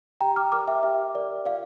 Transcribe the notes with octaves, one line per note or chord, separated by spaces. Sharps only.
G4 G5 A#5
D6 F6
A#4 D5 D6 F6
E5 G5
G4 E5
A#4 D5
F4 D5 F5